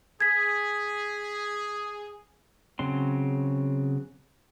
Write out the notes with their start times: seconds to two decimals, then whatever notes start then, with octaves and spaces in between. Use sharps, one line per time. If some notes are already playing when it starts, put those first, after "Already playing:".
0.21 G#4 G#6 B6
2.79 C#3 F#3 C4 C6